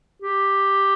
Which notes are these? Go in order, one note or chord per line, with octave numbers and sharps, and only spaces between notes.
G4